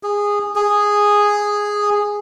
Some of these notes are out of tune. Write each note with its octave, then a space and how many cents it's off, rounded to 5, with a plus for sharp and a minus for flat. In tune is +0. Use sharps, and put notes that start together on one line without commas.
G#4 -15
G#4 -5